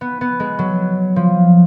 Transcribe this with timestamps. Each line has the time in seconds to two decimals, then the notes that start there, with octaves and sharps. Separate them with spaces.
0.01 B3
0.21 B3
0.40 G#3
0.59 F#3
1.16 F3